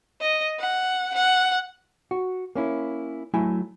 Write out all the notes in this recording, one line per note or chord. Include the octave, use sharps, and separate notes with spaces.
D#5
F#5
F#5
F#4
A#3 C#4 E4
F#3 A3 E4 G#5